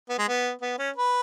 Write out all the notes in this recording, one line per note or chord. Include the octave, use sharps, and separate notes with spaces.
B3
G#3
B3
B3
C#4
B4